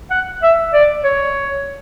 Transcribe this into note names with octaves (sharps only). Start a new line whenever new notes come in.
F#5
E5
D5
C#5